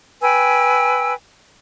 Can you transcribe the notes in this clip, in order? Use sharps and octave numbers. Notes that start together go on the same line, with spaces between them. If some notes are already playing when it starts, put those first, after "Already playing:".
B4 G5 G#5 E6